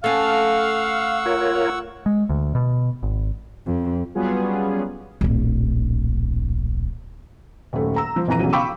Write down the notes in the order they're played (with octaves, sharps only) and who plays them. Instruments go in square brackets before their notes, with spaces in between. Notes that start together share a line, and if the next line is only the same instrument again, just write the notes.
[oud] A3 C#4 [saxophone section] F5 [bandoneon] F#5 C#6 E6
[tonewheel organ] F4 A#4 C#5
[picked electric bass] G#3
D2
B2
G#1
[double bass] F2
[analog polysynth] F#3 G3 B3 C#4 F4 G#4
[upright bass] D1 A#1
[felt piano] D#1 F#2 A3
A#5 E6
F3
A#1 F2 E3 A#5 D#7
B1 C#3 E3 F#3
F5 G5 B5 C#6 D6 E6